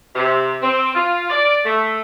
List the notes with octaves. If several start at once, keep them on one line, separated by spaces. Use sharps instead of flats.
C3
C4
F4
D5
A3